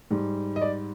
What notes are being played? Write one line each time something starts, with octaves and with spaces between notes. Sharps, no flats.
G#2 G3
D#5
D5